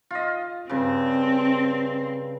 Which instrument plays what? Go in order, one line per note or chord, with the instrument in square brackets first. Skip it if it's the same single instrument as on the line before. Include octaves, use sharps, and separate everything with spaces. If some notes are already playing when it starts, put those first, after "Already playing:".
[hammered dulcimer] F4 D#5
[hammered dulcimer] G2 C#3 [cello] C4